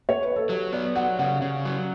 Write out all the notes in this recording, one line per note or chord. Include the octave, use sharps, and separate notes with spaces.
C#5
B4
A4
F#3 G4
B3 D5
F#3 F#5
C#3 F#5
C#3
F#3